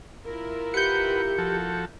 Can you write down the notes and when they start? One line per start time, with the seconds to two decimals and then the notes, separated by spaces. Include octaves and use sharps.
0.25 E4 F4 A#4
0.74 G4 B4 F#5 G6 C#7
1.38 F3 F#4 A4